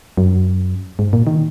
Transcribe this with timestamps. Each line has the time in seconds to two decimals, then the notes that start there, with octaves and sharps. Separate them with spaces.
0.17 F#2
0.99 G#2
1.13 A#2
1.27 D#3